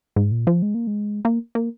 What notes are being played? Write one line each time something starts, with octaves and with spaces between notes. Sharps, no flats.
G#2
A#2
F3
G#3
A#3
G#3
A#3
A#3